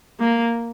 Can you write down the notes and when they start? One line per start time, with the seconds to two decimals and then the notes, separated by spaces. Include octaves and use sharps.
0.20 A#3